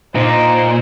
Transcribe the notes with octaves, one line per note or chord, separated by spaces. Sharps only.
A#2 D#4 C5 D#5